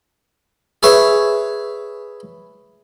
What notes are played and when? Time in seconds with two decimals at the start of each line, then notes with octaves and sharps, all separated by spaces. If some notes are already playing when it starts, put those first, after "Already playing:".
0.83 G#4 B4 C#5 E5 G#5